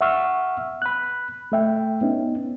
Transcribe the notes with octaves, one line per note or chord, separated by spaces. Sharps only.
E5 F#5 C#6 E6 F6
B5 F#6
A3 E5 G5
B3 C#4 D#4